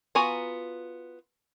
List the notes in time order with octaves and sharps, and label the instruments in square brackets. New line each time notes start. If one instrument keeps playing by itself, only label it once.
[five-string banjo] B3 F4 F#4 G#5 A#5